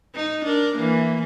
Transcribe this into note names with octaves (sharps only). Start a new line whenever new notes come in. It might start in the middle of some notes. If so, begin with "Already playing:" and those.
D#4
D4 A#4
E3 A#3